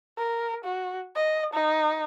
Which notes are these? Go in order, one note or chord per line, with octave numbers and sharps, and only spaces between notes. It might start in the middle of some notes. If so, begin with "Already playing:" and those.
A#4
F#4
D#5
D#4